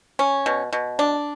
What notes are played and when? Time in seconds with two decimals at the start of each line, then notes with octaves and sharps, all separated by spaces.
0.19 C#4
0.46 B2
0.73 B2
0.99 D4